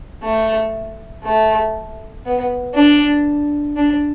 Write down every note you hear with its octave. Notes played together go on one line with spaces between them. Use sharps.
A3
A3
B3
D4
D4